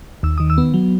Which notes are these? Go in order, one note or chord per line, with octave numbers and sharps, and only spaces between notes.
D#2 E6
D#3 D#6
E6
B3
F#3